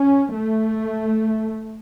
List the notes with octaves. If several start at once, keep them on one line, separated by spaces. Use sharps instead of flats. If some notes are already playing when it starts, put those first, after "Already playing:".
Already playing: C#4
A3